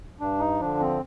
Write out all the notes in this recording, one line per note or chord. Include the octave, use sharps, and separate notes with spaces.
G2 D4
D#4
D3 F3 D4
C4